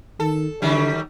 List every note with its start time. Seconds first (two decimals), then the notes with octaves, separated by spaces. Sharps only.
0.20 D#3 A4
0.62 D3 D#3 F#3 G3